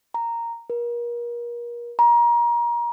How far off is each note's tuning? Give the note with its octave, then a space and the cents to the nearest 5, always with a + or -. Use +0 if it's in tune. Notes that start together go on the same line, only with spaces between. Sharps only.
A#5 -5
A#4 +35
A#5 +25